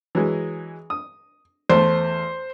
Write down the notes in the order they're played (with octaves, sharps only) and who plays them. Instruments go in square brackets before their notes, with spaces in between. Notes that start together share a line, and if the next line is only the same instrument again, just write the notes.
[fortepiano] E3 F#3 G#3
D#6
[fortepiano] E2 A3 [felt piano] C5